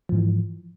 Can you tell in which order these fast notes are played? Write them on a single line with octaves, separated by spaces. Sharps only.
F3 G#2 E3